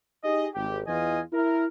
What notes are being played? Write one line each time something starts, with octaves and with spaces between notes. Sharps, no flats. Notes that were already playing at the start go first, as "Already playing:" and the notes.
D#4 G4 G#4 D#5
G#1 G4
E2 E3 F4 D#5 G#5
E4 A#4